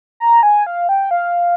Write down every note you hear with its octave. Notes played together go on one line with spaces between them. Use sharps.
A#5
G#5
F5
G5
F5